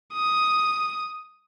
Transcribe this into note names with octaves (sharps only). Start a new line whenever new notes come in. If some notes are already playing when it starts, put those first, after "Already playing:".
D#6